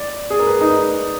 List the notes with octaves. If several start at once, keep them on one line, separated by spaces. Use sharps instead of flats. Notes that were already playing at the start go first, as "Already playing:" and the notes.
Already playing: D5
G#4
A#4
B4
D#4